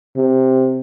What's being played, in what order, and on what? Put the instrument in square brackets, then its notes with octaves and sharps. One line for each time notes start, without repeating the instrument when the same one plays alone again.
[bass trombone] C3